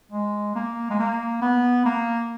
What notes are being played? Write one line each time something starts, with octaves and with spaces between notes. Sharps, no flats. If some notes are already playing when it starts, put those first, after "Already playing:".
G#3
A#3
G#3
A#3
B3
A#3